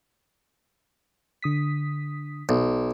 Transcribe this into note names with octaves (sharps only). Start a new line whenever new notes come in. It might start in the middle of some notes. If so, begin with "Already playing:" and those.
D3 D#6 B6
B1